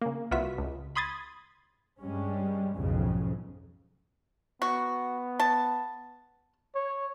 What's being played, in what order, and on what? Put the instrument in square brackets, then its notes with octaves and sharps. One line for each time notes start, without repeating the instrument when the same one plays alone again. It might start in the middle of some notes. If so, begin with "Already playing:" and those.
[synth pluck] C#3 A#3
C2 F4 F#4 B4 E5 B6
C#2
B5 C6 D#6 G#6 A6
[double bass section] G2 G3 G#3 C#4
B1 F2 G#2 C#3
[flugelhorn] B3 [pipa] F#4
[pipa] A5
[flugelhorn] C#5